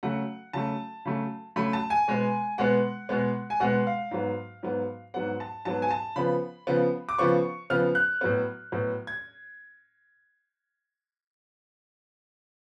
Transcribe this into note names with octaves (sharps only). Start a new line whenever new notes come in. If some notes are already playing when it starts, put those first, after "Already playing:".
C#3 F#3 A3 F#5
C#3 F#3 A3 A5
C#3 F#3 A3
C#3 F#3 A3 B5
A5
G#5
B2 G#3 B3
B2 G#3 B3 F#5
B2 G#3 B3
G#5
B2 G#3 B3 F#5
F5
G#2 F#3 B3
G#2 F#3 B3
G#2 F#3 B3 F#5
A5
G#2 F#3 B3 A5
G#5
A5
C#3 F3 B3 B5
C#3 F3 B3
D6
C#3 F3 B3 C#6
C#3 F3 B3 F6
F#6
A2 F#3 B3
A2 F#3 B3
G#6